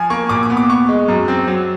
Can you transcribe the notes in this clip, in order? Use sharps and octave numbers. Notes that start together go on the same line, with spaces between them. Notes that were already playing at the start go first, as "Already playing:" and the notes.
Already playing: F3 G#5
A#3 C#6
A#2 D6
D6
B3
D6
B3 C#6
G#3
F#2
C4
F#3